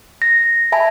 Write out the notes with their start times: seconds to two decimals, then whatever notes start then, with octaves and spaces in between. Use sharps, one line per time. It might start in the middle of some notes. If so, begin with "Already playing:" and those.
0.22 A#6
0.72 E5 G#5 A5 B5